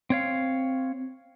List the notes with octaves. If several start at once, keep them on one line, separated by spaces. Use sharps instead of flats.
C4 C#5 F5